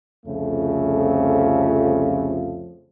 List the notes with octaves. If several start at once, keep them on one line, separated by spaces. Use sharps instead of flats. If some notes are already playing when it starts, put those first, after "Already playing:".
C2 F2 C#3 F3 A3